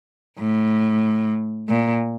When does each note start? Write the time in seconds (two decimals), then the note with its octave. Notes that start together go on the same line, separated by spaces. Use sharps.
0.38 A2
1.68 A#2